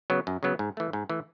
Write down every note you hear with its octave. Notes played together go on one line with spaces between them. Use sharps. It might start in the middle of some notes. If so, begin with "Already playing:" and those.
C#3 F#3 B3
F#2
C#3 F#3 B3
G#2
E3 A3
G#2
E3 A3